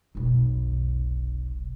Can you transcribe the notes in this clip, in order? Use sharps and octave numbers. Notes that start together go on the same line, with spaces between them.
F1 B1